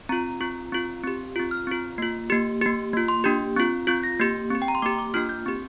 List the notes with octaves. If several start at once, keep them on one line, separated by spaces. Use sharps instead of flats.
C4 F4 A#5
C4 F4
C4 F4
C4 G4
C4 F4
F6
C4 F4
A#3 F4
A#3 G4
A#3 G4
A#3 F4
C6
A#3 D4 G4 G6
C4 F4
C4 F4 G6
A#6
A#3 G4 G6
C4 G4
G5
A#5
C6
A#3 G4 D6
D6
A#3 D4 F4 F6
G6
C4 G4